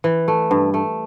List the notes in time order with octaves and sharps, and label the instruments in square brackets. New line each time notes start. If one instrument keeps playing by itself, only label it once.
[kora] E3
A3
G2
A3